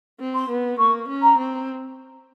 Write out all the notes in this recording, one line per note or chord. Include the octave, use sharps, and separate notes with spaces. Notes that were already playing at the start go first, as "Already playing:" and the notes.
C4
C6
B3
A#3 C#6
C#4
A#5
C4